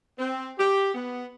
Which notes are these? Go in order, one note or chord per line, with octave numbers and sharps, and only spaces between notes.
C4
G4
B3